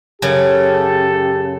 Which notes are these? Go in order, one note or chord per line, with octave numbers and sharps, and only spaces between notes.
F#2 C#3 G4 A4